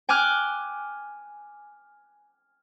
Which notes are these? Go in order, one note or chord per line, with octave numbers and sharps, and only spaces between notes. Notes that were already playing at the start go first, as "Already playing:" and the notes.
G5 G#5 D6 F6 F#6